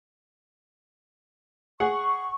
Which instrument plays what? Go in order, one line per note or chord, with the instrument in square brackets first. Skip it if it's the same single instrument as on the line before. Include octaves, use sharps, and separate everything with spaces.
[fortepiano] G#4 F#5 [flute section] C#6